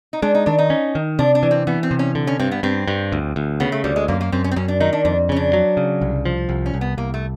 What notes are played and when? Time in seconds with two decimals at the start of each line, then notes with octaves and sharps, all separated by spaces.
0.13 D#4
0.22 G#3 D4
0.35 D#4
0.46 D#3 D4
0.59 D#4
0.70 C#4
0.95 D#3
1.19 C3 D4
1.35 D4
1.43 E3
1.51 C4
1.67 E3 B3
1.83 C4
1.91 C3
1.99 C#4
2.15 D3
2.27 C#4
2.39 G2 C4
2.52 B3
2.63 G2 C4
2.88 G2
3.12 D2
3.36 D2
3.60 C#3 B3
3.72 A3
3.84 D2 G3
3.96 G#3
4.08 F#2 A#3
4.21 A#3
4.32 F#2 C4
4.44 C#4
4.51 C4
4.56 F#2 C#4
4.68 D4
4.80 D#3 D#4
4.93 D4
5.05 F2 D4
5.29 C#3 C#4
5.37 D4
5.53 F#3
5.77 C#3
6.01 C2
6.26 F3
6.49 C2
6.66 C#4
6.74 C2
6.81 B3
6.97 C2 A#3
7.14 A3